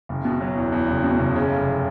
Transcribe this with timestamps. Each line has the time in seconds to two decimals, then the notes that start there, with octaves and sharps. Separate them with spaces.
0.09 F#1
0.25 B2
0.41 F#3
0.56 E2
0.72 E2
0.88 F#1
1.04 B2
1.19 F#1
1.36 C#3
1.51 F1